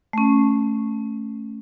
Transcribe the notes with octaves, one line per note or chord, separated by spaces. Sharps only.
A3 C#4